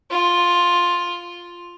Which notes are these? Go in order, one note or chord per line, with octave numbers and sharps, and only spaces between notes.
F4